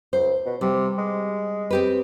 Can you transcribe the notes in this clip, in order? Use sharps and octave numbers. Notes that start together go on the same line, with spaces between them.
C#2 C5
B2
C3 G3
G#3
C4 G4 B4